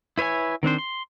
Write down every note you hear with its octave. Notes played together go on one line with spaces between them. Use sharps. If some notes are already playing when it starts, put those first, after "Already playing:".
E4 B4 C#5 E5 G#5
D#3 C4 D4 C5
C6